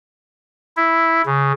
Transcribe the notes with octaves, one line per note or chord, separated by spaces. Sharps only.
E4
C#3